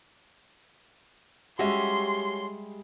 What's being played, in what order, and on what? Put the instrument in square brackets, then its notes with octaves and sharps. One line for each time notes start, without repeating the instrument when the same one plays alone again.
[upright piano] G3 G#3 [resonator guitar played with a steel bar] C#4 F#4 [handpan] G4 E5 [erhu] C6